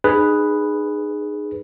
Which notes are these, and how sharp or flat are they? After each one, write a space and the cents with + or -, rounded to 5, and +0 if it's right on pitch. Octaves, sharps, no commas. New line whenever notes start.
D#4 -35 G#4 +0 B4 +0